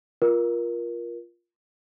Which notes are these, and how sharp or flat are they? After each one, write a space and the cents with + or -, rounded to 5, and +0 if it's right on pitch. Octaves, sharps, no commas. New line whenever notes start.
F4 +0 A#4 +25